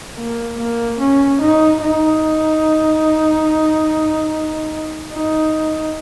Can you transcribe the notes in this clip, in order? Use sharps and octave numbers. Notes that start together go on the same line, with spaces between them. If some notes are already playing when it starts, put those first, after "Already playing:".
A#3
A#3
C#4
D#4
D#4
D#4